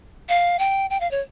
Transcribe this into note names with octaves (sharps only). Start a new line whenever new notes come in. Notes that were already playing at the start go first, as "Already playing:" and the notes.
F5
G5
G5
F5
C#5